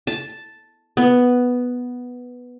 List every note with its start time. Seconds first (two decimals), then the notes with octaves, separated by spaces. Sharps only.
0.07 A5
0.97 B3